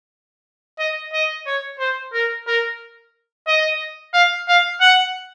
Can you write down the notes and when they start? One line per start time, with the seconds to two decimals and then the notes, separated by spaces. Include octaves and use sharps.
0.79 D#5
1.13 D#5
1.46 C#5
1.79 C5
2.13 A#4
2.47 A#4
3.47 D#5
4.14 F5
4.48 F5
4.81 F#5